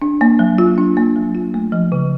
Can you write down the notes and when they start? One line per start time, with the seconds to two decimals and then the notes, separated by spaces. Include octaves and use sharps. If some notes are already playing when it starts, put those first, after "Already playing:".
0.02 D4
0.21 A#3
0.39 F#3
0.58 F4
0.78 D4
0.97 A#3
1.16 F#3
1.35 F4
1.54 A3
1.72 F3
1.92 C#3